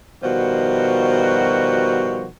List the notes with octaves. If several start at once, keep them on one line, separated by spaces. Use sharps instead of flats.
B2 D#3 F3 G3 F#4